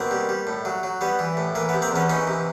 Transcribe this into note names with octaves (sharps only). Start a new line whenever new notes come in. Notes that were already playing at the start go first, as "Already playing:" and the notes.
Already playing: B2 A#3 C4
G3
G3
A2
F#3
F#3
G3 B3
E3
A2
E3 A#3
B3
C3
A#3 C4
E2 B3 C#4
E3 C#4 D#4
C3